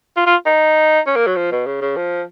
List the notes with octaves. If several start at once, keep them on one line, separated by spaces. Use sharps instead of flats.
F4
F4
D#4
C#4
A#3
F#3
F3
B2
C#3
C#3
F3